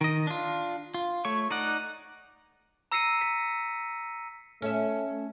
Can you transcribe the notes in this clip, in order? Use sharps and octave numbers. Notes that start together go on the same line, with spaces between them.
D#3 D#5
D4 F4
F4
A3 C#5 C#6
D#4 D5 F#5
A#5 E6 A#6 C7 C#7 D#7
B6
A3 C#4 E5